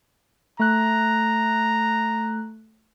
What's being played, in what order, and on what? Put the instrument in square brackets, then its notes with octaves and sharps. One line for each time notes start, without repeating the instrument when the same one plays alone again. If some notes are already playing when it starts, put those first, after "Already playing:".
[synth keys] A3 F#6 [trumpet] A#5